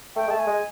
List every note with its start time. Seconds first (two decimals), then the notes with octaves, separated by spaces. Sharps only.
0.16 A3 G5
0.27 G#3
0.30 A3 A5
0.39 G#5
0.47 G#3